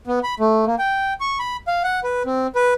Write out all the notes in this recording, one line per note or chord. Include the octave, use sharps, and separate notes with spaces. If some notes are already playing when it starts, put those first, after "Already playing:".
B3
B5
A3
A#3
G5
C#6
B5
F5
F#5
B4
C4
B4